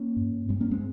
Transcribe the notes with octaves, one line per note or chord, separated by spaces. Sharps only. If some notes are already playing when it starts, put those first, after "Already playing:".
Already playing: A#3 C#4
G2
G2 G#3 C4
A#3 C#4
G#3 C4